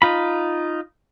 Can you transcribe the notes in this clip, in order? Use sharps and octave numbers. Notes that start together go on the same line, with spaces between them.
D#4 F4 B5